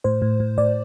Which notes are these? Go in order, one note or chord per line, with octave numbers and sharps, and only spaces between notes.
A2 C5
A2
A2
A2 D5